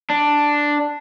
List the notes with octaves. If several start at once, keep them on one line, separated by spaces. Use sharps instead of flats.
D4